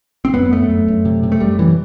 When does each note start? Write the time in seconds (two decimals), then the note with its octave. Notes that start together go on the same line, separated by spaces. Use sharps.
0.25 C4
0.34 F#2 B3
0.52 F#2 A3
0.70 F#2
0.88 F#2
1.05 C3
1.23 C3
1.32 A3
1.40 F#2 G3
1.58 F#2 E3